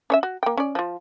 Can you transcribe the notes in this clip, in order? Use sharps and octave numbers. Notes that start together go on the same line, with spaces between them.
C#4 C#5 E5
F#4
A#3 G5
C#4 D5
F3 F4